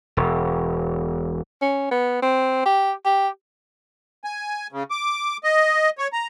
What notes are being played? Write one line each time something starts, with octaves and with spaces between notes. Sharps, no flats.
E1
C#4
B3
C4
G4
G4
G#5
C#3
D6
D#5
C#5
A#5